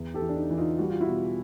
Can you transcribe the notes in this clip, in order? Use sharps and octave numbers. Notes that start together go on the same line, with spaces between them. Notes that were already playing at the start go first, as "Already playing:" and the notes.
Already playing: E2
G4 A4
E3
D4
D#4
E3
D#4 F4
G3 F#4
F4
E4 F#4
B2